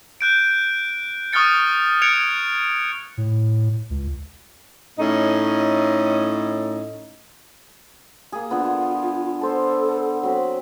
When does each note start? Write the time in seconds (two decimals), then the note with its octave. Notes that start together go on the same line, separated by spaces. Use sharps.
0.21 F#6 G6 D7
1.33 C#6 D#6 F6 F#6 A6 C#7
2.02 D#6 F#6 G#6 C#7 D7 F7
3.17 A2
3.90 C#2
4.99 A2 C#4 D#4 D#5
8.32 A#3 G#4
8.51 D3 B3 F4
9.41 B3 A4 C5 A5
10.23 F#3 C4 B5